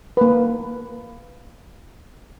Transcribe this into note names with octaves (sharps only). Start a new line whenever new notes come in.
A#3 B4